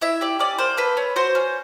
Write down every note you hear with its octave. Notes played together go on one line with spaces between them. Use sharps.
E4 E5
G4 D5
C#4 D5
A#3 C5
A4 B4
C#4
F#4 C5
C#4